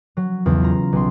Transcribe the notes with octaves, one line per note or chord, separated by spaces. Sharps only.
F#3
B1 E2 C#3
F4 A#5
B1 B3 C6